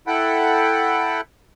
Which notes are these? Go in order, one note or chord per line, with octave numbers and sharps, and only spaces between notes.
E4 A4 F#5 G5 B5